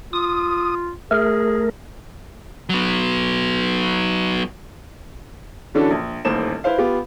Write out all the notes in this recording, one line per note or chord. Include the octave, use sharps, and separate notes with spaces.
F4 D#6
A3 G#4 A#4
F#3 B3
D3 E3 C#4 D4 F#4 A4
A#1
D#1 A1 D#2 C5 E7
E4 B4 C5 F5
B3 F4 G4